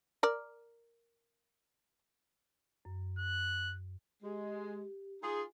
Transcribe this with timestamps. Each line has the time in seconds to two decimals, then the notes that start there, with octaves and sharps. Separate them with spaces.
0.23 A#4 D5
2.85 F#2
3.19 F#6
4.23 G#3 G4
5.22 D#4 F4 G#4